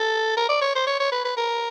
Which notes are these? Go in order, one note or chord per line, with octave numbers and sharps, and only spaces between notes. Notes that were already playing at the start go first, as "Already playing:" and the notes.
Already playing: A4
A#4
D5
C#5
C5
C#5
C#5
B4
B4
A#4